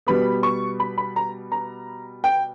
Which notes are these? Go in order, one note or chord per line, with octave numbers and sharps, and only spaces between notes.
B2 G3 B3 B5
C#6
B5
B5
A#5
A#5
G5